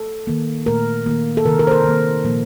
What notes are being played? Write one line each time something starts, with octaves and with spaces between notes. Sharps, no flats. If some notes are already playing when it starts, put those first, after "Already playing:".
Already playing: A4
D#3 A#3
A#2 A3 A#4
D#3 A#3
A4
C3 D#3 A#3 A#4
A#4
C5
A#4
D#3 A#3
A#2 F3 A#3